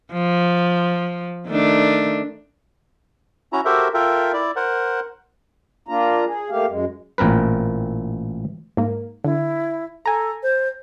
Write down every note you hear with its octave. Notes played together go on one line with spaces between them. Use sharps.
F3
D#3 A3 D4
C#4 E4 F#4 A#5
F#4 G4 A4 A#4 C5 E5
F4 A4 A#4 E5 G5
E4 D5
A#4 C5 F#5
A#3 D4 F4 A#5
G#4
A3 A#3 G4 F5
F#2 G#3
A1 A#2 C4 A#4 B4
G#2 A#3
D3 E4
A4 G#5 A#5
C5